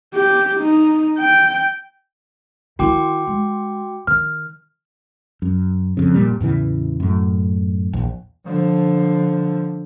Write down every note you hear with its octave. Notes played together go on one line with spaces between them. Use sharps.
G4
D#4
G5
D#3 E4 F#4 G5 D6
G#3
D#3 F6
F#2
F2 C#3
F1 A#2 G3
E2 A2 C#3 E3
F#2 A2
A#1 E2
D3 F3